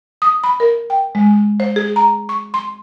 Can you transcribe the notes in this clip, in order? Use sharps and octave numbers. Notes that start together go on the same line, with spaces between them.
D#6
B5
A#4
G5
G#3
C5
G#4
A#5
C#6
C6